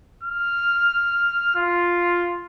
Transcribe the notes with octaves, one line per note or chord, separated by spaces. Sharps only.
F6
F4